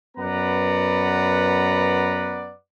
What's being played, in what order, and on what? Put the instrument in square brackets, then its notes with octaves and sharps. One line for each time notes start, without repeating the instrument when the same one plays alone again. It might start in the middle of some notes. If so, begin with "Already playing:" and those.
[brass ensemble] F#2 B3 B4 D5 F#5 A#5